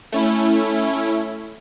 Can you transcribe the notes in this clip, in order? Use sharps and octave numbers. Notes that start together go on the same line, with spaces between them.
A3 C#4 E4